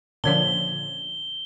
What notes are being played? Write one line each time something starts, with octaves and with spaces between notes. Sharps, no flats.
A#2 D3 F3 C#4 C#5 D5 G7